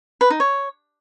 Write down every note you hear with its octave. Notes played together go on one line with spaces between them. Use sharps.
B4
D#4
C#5